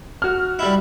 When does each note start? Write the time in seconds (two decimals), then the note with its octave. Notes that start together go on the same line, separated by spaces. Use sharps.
0.22 F#4 F6
0.59 G3 E4